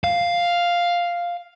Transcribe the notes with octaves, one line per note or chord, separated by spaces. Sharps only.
F5